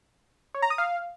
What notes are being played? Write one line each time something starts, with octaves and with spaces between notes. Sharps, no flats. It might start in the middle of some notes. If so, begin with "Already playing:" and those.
C#5
A#5
D#6
F5